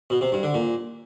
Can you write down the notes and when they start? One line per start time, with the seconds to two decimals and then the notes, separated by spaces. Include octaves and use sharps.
0.10 B2
0.21 C3
0.32 G2
0.43 D3
0.54 A#2